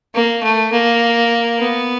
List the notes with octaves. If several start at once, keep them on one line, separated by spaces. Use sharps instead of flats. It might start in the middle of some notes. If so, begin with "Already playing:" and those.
A#3
A3
A#3
B3